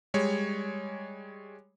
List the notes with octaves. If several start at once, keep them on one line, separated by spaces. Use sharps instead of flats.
G3 G#3 C#5